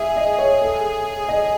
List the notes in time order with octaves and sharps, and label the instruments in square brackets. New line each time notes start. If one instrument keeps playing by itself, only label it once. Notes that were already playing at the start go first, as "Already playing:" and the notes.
Already playing: [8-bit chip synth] G#4 [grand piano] E5
[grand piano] D#5
C#5
A4
D#5